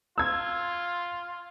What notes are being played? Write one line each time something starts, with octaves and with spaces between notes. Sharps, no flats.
F4 E6 G#6